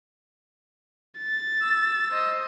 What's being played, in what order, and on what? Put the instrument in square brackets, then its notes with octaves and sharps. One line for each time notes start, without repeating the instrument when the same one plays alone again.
[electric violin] A6
[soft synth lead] E6
[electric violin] C5 D#5